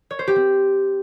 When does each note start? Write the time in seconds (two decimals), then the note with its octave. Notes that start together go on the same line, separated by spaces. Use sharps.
0.11 C#5
0.19 C5
0.27 G4
0.36 C4